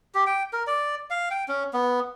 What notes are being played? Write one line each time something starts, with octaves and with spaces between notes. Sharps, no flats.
G4
G5
A#4
D5
F5
G5
C#4
B3